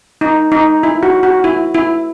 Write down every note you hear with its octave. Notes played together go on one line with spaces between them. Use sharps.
D#4
D#4
E4
F#4
F#4
E4
E4